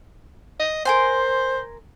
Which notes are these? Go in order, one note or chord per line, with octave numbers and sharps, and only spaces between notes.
D#5
A#4 C5 G#5 C6